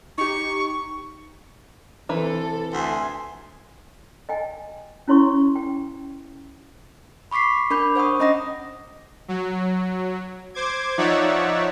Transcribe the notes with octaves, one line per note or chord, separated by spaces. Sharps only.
D#4 G4 C#6
C3 E3 A4 B4 C5
D2 E5 G#5 C6
D#5 G5 G#5
C#4 E4 C#5 C6 C#6
G5
B5 C#6 D6 B6 C7
D4 A#4 B5 D6 G6
C5 F#5 C#6 D#6
C#4 D#5 F#5 A#5 D#6 A#6
F#3
C5 D6 G#6
F3 D#4 C#5 D5 E5 F#5